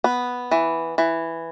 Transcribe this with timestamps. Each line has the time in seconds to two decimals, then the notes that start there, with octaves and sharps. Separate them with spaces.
0.04 B3
0.51 E3
0.98 E3